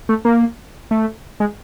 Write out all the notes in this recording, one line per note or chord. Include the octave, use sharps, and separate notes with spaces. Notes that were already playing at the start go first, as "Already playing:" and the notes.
A3
A#3
A3
G#3